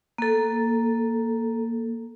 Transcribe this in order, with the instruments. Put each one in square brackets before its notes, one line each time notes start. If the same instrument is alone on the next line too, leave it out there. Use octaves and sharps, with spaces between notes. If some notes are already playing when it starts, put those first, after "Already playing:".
[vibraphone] A#3 A4